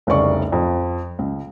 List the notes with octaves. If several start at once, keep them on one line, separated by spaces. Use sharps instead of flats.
F1 C2 C#3 D5 C#6
F2
C#2